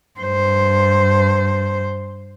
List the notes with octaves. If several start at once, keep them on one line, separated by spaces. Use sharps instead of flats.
G2 C5